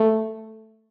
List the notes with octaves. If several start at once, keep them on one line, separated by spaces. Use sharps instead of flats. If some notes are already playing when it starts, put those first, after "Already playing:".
Already playing: A3